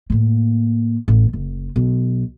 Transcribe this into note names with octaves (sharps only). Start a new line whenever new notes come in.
A2 A#3
A1
F#1
B1